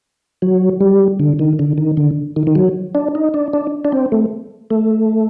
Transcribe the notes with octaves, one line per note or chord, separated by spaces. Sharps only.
F#3
G3
D3
D#3
D3
D#3
D3
D#3
D#3
F#3
D4
D#4
D4
D4
D4
C4
A3
A3